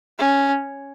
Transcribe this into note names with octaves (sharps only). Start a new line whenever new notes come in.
C#4